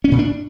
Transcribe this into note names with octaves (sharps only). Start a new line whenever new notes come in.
C#4
A#2
D4